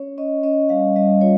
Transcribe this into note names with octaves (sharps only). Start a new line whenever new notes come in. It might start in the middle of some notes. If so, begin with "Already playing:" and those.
Already playing: C#4 C#5
C#4 D#5
C#4 D#5
G3 F5
G3 D#5
F4 C#5